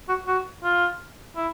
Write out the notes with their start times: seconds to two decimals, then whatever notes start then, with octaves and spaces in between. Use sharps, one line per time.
0.09 F#4
0.27 F#4
0.63 F4
1.36 E4